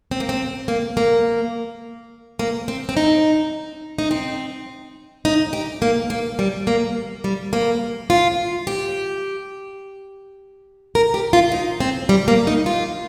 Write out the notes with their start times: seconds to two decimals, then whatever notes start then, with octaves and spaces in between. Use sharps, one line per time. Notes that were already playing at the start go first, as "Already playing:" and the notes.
0.11 C4
0.20 A#3
0.29 C4
0.68 A#3
0.97 A#3
2.39 A#3
2.68 C4
2.89 C4
2.97 D#4
3.98 D#4
4.11 C4
5.25 D#4
5.53 G4
5.82 A#3
6.10 A#3
6.39 G3
6.67 A#3
7.24 G3
7.53 A#3
8.10 F4
8.67 G4
10.95 A#4
11.14 G4
11.33 F4
11.52 D#4
11.80 C4
12.09 G3
12.28 A#3
12.47 D#4
12.66 F4